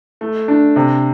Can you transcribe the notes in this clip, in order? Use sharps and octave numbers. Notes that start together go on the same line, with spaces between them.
A3
D4
C3